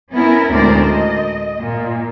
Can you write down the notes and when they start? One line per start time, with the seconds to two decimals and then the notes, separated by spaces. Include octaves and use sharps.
0.12 B3 C#4 E4 A#4
0.52 D2 A2 G#3 A#4 C5 D5
0.81 D#5
1.59 A#2